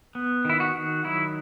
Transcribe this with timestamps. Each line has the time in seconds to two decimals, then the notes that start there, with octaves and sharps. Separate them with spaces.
0.15 B3
0.45 D#3 E4
0.60 F#4
0.75 D#3
1.04 F#3 E4